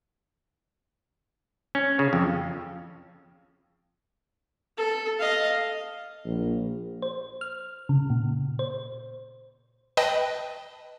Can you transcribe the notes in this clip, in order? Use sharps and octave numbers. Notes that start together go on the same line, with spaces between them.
C#4
C#3
F2
A4
D#5 F5
A#1
C5
F6
C#3
A#2
C5
B4 D#5 G5 A5